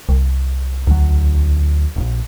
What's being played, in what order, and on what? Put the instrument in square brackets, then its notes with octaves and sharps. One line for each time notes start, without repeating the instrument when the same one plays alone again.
[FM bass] C2
[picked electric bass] D2 F#3
D1 A#1